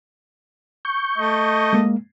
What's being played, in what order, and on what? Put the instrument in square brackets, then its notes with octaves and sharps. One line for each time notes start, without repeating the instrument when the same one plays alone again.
[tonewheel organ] C#6 G6
[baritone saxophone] A3 [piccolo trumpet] D#5
[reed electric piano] G#3 A#3